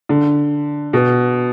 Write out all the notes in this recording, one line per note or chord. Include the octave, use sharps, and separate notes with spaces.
D3
B2